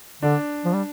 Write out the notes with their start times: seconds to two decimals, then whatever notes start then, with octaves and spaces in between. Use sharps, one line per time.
0.22 D3 D4
0.65 F3
0.74 G3